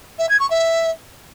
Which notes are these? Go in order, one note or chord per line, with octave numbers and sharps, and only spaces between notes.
E5
G#6
C#6
E5